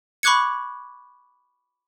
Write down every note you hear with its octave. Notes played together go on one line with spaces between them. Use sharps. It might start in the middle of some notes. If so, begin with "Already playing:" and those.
B5 C#6 D6 F#6 G#6 C#7